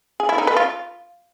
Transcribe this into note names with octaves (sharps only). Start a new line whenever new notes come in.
G#4
E4
D#4
B4
F4